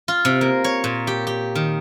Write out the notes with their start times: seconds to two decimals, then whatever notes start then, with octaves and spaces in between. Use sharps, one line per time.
0.08 F4
0.25 C3
0.41 A#3
0.64 C#5
0.84 A#2
1.07 G4
1.27 G4
1.55 D#3